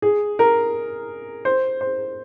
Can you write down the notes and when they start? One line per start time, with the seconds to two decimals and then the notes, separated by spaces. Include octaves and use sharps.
0.02 G#4
0.39 A#4
1.45 C5
1.81 C5